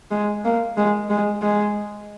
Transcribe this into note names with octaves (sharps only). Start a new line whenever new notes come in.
G#3
A#3
G#3
G#3
G#3